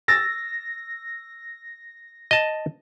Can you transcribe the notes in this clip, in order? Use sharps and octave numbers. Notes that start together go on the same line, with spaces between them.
E6 A6 A#6
D#5 A5